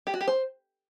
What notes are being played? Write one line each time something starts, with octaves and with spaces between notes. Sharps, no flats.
G4
F#4
G4
C5